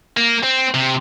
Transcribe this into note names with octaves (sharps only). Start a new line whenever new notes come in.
A#3
C4
C3